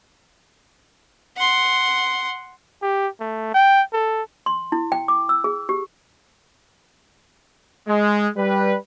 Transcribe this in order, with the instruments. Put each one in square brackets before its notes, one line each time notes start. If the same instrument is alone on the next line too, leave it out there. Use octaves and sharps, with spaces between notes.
[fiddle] F#5 C6
[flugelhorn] G4
A3
G5
A4
[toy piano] C6
E4
G5
D6
E6
G#4
G4
[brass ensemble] G#3
G3 B4